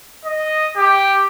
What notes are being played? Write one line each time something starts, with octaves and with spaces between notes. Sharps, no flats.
D#5
G4